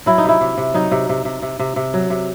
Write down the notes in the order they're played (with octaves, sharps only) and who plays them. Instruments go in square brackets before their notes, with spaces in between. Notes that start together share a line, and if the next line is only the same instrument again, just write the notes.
[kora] F#3 E4
D#4
C3 E4
C3
C3
F#3 D#4
C3
C3
C3
C3
C3
C3
F#3
C3